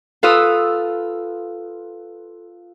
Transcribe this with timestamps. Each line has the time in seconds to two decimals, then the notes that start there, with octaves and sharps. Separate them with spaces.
0.23 F4 A4 B4 F5 D#6 E6